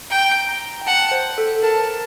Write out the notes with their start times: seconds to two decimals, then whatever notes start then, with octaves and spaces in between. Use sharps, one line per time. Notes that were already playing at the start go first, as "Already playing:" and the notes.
0.10 G5 A#5
0.49 A#5
0.81 G5
0.87 F#5 A5
1.11 C5
1.38 A4
1.62 A#4 A5